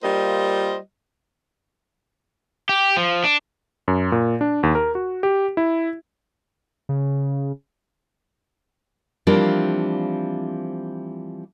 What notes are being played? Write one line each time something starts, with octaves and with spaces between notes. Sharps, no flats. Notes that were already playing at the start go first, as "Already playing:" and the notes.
G3 A#3 F4 C5 D#5
G4
F3
D4
F#2
A#2
D4
D#2
A#4
F#4
G4
E4
C#3
E3 F3 G3 A#3 C4 D4